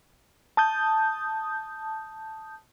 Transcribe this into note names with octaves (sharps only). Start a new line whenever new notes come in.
A5 D#6 G6